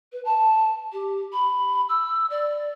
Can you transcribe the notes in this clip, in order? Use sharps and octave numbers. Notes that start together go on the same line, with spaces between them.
B4
A5
G4
B5
E6
D5